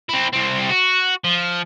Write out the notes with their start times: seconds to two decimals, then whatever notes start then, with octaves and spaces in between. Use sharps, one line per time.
0.09 C4 E4
0.33 C2 C4
0.70 F#4
1.24 F3